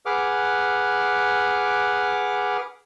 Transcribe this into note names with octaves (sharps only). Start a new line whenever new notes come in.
G#4 B4 F#5 D6 F6